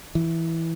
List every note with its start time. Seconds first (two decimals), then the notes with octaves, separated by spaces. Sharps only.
0.15 E3